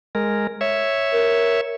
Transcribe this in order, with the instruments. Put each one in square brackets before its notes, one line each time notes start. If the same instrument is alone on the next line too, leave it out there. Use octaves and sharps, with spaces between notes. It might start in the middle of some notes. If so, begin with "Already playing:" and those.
[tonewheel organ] G#3 A#4
C#5 E5
[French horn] A#4